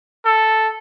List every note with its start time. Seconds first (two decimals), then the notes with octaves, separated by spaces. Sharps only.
0.25 A4